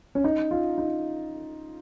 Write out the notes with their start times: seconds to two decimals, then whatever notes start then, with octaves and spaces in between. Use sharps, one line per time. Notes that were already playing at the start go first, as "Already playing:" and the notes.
0.15 C#4
0.24 D#4
0.51 F4
0.78 D#4